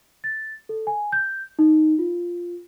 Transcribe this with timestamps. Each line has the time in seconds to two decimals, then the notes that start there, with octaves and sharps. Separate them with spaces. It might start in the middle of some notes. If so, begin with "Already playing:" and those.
0.24 A6
0.69 A4
0.87 G#5
1.12 G6
1.59 D#4
1.99 F4